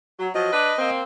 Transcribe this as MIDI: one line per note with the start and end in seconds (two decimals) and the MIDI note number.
0.20 0.29 54
0.35 0.49 53
0.35 0.49 54
0.35 0.90 75
0.52 0.73 62
0.52 0.73 71
0.79 1.03 58
0.79 1.03 60